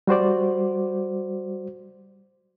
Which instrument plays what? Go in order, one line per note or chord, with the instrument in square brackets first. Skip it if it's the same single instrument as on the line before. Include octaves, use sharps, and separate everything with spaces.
[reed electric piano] G3 F#4 C5 D5